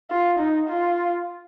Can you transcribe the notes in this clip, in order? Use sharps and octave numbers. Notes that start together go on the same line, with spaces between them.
F4
D#4
F4